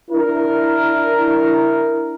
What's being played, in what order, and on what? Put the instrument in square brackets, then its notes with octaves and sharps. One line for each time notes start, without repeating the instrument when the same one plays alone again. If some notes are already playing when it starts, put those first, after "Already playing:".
[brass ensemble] D4 E4 A#4